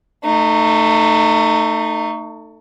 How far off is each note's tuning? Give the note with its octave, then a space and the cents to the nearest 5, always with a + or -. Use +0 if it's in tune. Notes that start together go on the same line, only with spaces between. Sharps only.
A3 +20 D#4 -15